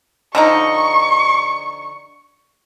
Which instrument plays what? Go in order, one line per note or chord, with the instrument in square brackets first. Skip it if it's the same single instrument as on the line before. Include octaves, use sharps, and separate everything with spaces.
[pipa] D3 F3 D#4 [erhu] C#6